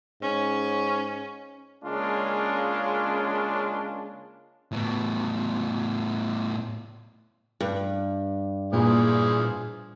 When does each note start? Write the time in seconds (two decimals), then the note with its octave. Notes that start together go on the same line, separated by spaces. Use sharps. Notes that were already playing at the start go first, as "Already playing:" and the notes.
0.22 G#2 C#4
1.83 C#3 G#3 A#3 C#4 D4 F4
4.72 A2 B3
7.61 G2
8.73 A#2 E3 F3 G#4